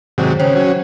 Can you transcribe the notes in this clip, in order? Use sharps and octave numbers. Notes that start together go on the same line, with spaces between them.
G#2 C3 D#3 F#3 C5
C#3 C5 C#5 G5
F#3 C#4